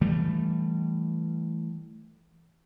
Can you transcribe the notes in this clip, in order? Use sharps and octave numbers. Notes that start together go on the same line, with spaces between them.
E3 G3 A3